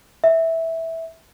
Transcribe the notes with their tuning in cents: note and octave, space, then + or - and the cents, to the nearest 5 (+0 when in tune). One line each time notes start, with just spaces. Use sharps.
E5 -10